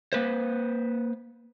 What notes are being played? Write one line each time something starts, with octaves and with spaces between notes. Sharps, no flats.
A#3 B4 C5